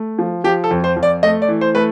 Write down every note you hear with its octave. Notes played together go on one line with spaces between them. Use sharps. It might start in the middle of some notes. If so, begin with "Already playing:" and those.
Already playing: A3
F3
F3 G4
A4
F2
C5
F2
D5
A3 D#5
D5
E3
C5
A3 B4